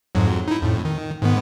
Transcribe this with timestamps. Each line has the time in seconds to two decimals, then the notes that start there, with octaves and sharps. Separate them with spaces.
0.15 F2 G#2 F#3
0.48 D#4 E4
0.62 F2 A2
0.85 D#3
1.22 G#2 D#3 B3